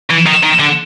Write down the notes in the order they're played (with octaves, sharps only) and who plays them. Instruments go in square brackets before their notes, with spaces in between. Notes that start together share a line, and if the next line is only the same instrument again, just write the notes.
[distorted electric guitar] E3
D#3
D#3
D3